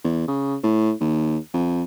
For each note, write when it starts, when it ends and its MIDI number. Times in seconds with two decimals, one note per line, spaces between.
0.04 0.23 40
0.28 0.56 49
0.63 0.92 45
1.01 1.38 39
1.54 1.83 41